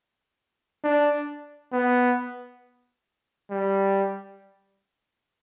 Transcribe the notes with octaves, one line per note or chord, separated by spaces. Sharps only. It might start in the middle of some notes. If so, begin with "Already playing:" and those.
D4
B3
G3